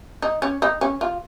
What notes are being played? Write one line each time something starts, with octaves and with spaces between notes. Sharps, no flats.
D#4
C#4
D#4
C#4
F4